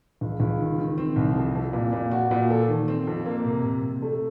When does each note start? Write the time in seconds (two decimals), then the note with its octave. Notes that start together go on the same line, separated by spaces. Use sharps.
0.21 C#2
0.40 C#2
0.59 D#3
0.78 D#3
0.98 C4
1.16 C2
1.36 F2
1.55 F2
1.73 A#2
1.92 A#2
2.11 F#4
2.31 A#2
2.50 A4
2.68 D#3
2.88 C4
3.07 F2
3.26 A#3
3.45 C3
3.63 C3
3.82 C3
4.02 A3